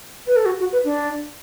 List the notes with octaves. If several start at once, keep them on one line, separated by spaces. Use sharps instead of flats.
B4
A4
F#4
F#4
B4
D4